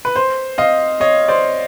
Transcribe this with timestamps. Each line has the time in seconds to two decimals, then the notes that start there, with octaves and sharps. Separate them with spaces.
0.05 B4
0.16 C5
0.58 D#5 F5
1.00 C#5 D#5
1.28 C5 D5